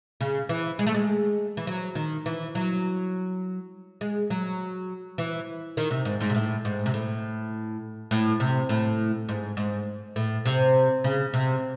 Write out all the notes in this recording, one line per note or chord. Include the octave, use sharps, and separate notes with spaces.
C#3
E3
G#3
A3
G#3
E3
F#3
D#3
E3
F#3
G#3
F#3
E3
D#3
C3
G#2
G#2
C3
A2
G#2
C3
A2
A2
C3
A2
G#2
G#2
A2
C3
C#3
C3